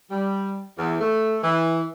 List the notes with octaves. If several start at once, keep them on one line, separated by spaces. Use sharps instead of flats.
G3
E2
A3
E3